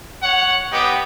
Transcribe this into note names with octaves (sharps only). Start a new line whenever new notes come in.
C#5 F#5
B3 D#4 G4